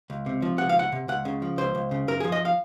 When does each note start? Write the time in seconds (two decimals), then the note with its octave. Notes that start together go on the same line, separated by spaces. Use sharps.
0.10 C#2
0.26 C3
0.42 F3
0.58 C#2 F#5
0.69 F5
0.75 C#2 F#5
0.92 C3
1.08 C#2 F#5
1.25 C#3
1.42 F3
1.58 C#2 C5
1.75 C#2
1.91 C#3
2.08 F#2 A#4
2.20 F3 G#4
2.32 D#5
2.45 F5